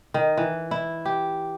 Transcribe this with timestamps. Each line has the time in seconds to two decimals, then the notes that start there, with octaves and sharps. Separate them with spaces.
0.14 D#3
0.37 E3
0.71 E4
1.05 G4